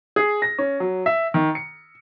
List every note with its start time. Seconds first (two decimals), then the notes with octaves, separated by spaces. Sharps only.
0.16 G#4
0.42 A#6
0.58 C#4
0.80 F#3
1.06 E5
1.34 D#3
1.55 C#7